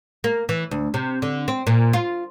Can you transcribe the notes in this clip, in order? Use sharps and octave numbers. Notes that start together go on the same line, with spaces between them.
A#3
E3
D2
C3
D3
C4
A#2
F4